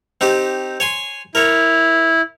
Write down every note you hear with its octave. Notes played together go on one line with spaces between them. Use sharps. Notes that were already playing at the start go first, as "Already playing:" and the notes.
C4 D#4 G4
C#5 G#5 C6
E4 A#4 C#5